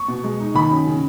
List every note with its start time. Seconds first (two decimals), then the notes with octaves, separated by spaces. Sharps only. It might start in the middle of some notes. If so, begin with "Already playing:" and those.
Already playing: C#6
0.08 B2
0.24 G#3
0.40 D#4
0.55 D#3 B5
0.71 F#2
0.87 C#3